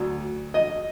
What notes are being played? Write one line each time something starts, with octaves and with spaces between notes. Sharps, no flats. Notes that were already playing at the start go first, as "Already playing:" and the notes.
Already playing: D2 F#3
D#5